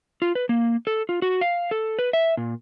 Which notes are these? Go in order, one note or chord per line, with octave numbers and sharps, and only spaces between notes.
F4
B4
A#3
A4
F4
F#4
F5
A4
B4
E5
A#2